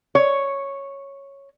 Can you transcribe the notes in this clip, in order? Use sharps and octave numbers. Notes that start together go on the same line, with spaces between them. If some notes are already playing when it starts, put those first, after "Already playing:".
C#5